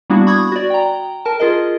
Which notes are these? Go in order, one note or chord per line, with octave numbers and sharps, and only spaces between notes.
G3 A#3 B3 D4 E4 F#4
B5 C#6 D#6 G#6
F#4 D5
G5 A#5
A#4 A5
F4 G#4 A#4 D#5